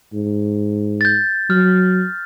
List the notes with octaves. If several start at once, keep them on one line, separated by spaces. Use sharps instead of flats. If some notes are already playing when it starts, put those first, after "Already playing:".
G#2
G6 A6
F#3 F6